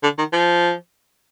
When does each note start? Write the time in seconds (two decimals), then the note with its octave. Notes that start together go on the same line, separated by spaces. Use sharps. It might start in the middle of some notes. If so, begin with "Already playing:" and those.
0.03 D3
0.18 D#3
0.33 F3